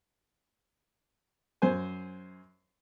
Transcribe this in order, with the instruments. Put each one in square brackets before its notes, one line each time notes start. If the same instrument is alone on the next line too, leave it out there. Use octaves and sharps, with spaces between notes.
[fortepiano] F#2 C5 G#5